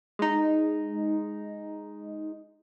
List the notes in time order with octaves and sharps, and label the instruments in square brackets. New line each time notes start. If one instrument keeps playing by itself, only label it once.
[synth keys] G#3 D#4